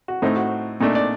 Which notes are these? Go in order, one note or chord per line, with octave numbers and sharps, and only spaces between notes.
F#4
A2 A3 C4 D#4
F#4
A#2 A3 D4 D#4
D5